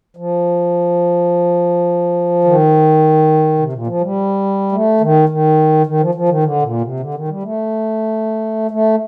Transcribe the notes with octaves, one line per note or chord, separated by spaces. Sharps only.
F3
D#3
C3
A#2
F3
G3
A3
D#3
D#3
D#3
F3
F3
D#3
D3
A#2
C3
D3
D#3
G3
A3
A3